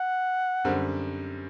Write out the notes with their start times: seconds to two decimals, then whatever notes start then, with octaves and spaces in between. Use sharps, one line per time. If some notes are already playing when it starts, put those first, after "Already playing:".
Already playing: F#5
0.64 F#2 D3 G3 C4